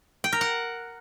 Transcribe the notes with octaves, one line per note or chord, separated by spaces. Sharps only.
G5
A#4
F#5